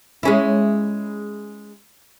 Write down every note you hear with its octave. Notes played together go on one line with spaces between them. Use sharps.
G#3 C#4 E4